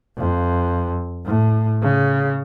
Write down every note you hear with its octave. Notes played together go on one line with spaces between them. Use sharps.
F2
A2
C#3